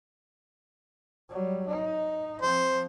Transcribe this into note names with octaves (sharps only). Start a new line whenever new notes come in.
F#3 G3
D#4
F3 C4 C5